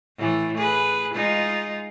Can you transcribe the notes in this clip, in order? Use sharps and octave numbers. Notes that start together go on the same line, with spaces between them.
A2 E3 A3
G#4 B4
G#3 D#4 F4